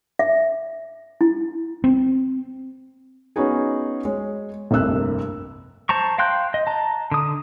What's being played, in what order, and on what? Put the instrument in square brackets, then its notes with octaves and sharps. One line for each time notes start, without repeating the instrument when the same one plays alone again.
[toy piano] E5
E4
[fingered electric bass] C4
[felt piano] B3 C#4 D#4 F#4 G#4
G#3 C#5
F1 C2 G2 A#3 E6 F#6
[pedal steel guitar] C5 A5 A#5 C#6
F5 G5 C6 F#6 G6
D#5
A5 A#5
D3 D#6